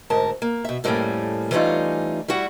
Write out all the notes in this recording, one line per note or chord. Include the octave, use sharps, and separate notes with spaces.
D2 G#2 A#4 A5
A#3
B2 E5
F2 A2 G3 A3 A#3 C#4
E3 G3 A3 C#4 D#4 F4
G3 E4 F#4 F#5